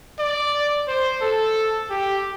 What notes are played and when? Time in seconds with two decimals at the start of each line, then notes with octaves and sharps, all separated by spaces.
0.19 D5
0.88 C5
1.22 A4
1.90 G4